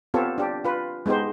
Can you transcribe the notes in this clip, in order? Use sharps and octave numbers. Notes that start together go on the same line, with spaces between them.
B3 C4 F4 G4 A4 C#5
D4 G4
F4 B4
G#3 B3 D#4 G4 C5